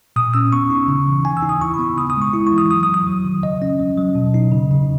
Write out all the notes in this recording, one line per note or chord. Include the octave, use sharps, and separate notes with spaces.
A#2 D#6
C#4 E6
B3 C#6
D#4
C#3
E3
D#4 G#5
E6
D#4
D#6
E4 C#6
B5
B3
C#3 D#6
D#6
G#3
C#6
E4
C#6
E3
D#6
F#3 D#6
D#6
F#3
D#6
F#3
D#3
C#3 D#5
C#4
F#3
F#3
B2
D#4
C#3
C#3